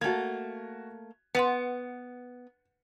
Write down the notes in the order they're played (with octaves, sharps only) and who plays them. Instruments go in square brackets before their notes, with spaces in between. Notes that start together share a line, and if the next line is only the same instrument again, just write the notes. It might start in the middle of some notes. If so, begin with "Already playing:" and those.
[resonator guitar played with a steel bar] A3 A#3 [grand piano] F#4 G#6
[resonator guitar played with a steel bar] B3 [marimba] B4 F#5 C6 [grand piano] C#7